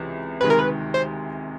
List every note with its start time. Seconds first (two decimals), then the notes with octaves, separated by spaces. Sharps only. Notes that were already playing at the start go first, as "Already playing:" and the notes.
Already playing: C#2 C3 E3
0.41 D2 C3 D#3 G#3 B4
0.50 A#4
0.59 B4
0.94 C5